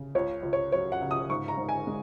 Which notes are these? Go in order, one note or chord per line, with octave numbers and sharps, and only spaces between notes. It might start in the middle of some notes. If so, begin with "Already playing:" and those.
Already playing: C#3
C#2 C#5
C#2
C#5
F#3 C#5
F#5
C#3
D#6
G#2 C#6
A#5
G#2
G#5
G#3